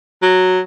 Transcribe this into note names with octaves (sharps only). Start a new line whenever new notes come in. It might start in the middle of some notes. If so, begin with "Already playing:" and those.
F#3